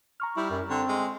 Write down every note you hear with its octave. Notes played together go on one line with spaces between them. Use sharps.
A#5 C#6 F6
G3 E4
F#2
D3 C4
G#3